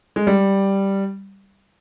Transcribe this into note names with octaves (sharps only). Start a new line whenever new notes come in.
G#3
G3